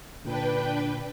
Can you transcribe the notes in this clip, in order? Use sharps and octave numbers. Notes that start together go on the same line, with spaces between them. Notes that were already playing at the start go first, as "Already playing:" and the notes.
A#2 D3 D4 B4 G5